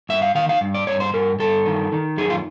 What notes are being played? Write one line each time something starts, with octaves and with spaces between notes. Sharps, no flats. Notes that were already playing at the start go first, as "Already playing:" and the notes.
G2 E5
F5
D#3 F5
F5
G2
D5
G2 C#5
C5
G2 A#4
G2 A4
D#3
D#3
F#2 G#4
F4